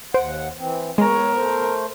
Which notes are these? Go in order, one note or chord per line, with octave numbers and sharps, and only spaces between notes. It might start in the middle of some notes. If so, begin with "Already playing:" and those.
D#2 C5 F#5 D7
E3 C4
G#3 B3 A#4 C#5 A#5
A3 C5